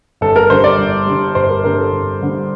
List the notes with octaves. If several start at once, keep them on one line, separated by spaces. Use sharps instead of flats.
G1 A4
A#4
G2 D3 G3 C5
D5
G1
G2 D3 G3
G1 C5
A#4
G2 D3 G3 A#4
A4
G1
G2 D3 G3